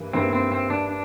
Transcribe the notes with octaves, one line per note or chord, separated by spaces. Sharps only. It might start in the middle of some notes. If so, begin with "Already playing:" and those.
Already playing: G2 E3 A#3
G2 E3 A#3 C4 E4
C4
C4
D4
D4